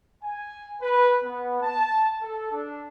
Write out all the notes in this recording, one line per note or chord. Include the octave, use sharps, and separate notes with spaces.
G#5
B4
B3
A5
A4
D4